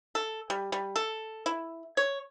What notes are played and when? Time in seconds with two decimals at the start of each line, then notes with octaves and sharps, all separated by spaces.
0.15 A4
0.50 G3
0.72 G3
0.96 A4
1.46 E4
1.97 C#5